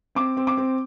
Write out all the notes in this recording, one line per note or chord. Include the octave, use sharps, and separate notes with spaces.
C4 D6
C4
D6
C4